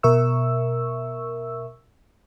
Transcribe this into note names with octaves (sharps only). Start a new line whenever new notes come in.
B2 A#4 E5 C#6 E6